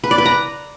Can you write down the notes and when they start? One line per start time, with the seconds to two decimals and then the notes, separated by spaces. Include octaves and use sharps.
0.04 B4
0.11 D5
0.18 B4
0.26 A#5